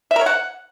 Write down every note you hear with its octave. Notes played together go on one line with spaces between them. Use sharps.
E5
A#4
C#5
F#5